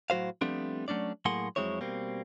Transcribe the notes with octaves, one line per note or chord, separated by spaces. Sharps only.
A2 F#3 F#4 C5 F5
F3 G3 A3 B3 C4 D4
F#3 A3 C#4 D4 D5
A2 F#3 A#3 G#4 F#5 C6
F2 F#3 G#3 C4 E4 C#5
B2 G3 A#3 C4